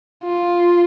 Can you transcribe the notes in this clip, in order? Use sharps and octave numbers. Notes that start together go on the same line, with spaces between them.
F4